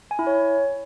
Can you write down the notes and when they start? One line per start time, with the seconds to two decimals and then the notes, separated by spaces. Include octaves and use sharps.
0.11 G#5
0.19 E4
0.27 C#5